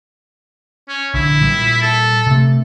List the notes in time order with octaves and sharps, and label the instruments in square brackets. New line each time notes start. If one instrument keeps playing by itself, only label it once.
[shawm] C#4
[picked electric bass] A#1 D3 [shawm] E4
[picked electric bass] A#2 G3
[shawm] A4
[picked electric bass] C3 A3